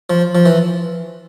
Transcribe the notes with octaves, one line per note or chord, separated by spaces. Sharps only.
F3
F3
E3